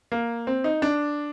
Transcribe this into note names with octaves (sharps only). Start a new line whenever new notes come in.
A#3
C4
D#4
D4